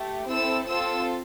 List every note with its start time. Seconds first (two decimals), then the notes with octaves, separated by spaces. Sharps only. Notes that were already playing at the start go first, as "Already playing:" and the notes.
Already playing: A3 G4
0.27 C4 E4 A4 E6
0.66 C4 F4 A4 E6